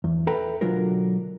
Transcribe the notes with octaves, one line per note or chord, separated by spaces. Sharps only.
E2
A4 B4 E5 G5 A#5 B5
B1 D3 F#3 G#3 F4 A#4